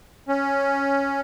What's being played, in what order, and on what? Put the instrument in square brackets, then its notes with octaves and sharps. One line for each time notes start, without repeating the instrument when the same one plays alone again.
[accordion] C#4